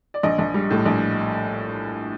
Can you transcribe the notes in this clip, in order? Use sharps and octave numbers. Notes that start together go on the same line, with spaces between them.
D5
A#1 D#5
A#1
G3
A2
A#1